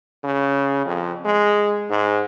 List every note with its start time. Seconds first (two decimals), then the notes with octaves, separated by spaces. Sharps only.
0.24 C#3
0.85 F2
1.25 G#3
1.90 G#2